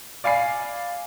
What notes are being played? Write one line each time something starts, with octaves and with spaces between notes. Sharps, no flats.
D5 F5 G#5 B5 C7